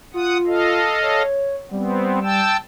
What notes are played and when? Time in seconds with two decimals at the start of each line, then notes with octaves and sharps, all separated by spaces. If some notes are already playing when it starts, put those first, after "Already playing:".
0.14 F4 F#5 D#6
0.47 A4 D#5 F5
1.02 C#5
1.71 G3 B3 C4
2.23 G5 A5 E6